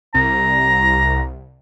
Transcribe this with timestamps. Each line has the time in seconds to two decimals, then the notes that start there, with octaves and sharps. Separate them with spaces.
0.14 C2 A#5